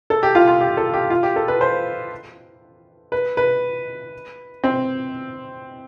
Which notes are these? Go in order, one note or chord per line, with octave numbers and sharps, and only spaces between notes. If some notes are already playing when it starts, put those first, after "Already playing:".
A4
G4
F4
F4
G4
A4
G4
F4
G4
A4
B4
C5
B4
B4
C4